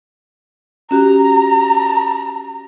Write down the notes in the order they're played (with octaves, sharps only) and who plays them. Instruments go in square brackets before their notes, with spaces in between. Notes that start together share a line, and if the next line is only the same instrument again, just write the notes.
[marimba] C#4 F#4 G4 [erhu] A#5